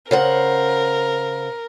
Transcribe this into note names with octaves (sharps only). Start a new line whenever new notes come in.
C#3 A#4 C5 F#5